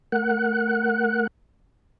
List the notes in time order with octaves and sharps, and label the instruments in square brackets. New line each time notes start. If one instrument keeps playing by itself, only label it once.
[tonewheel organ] A3 A#4 F#5 F#6